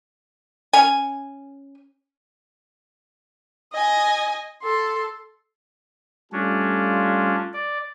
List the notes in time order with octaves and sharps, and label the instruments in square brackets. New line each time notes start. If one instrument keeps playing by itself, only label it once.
[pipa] C#4 G#5
[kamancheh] D#5 G#5
A4 C6
[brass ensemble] G3 A3 F4 [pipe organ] C#4 D4
[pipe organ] D5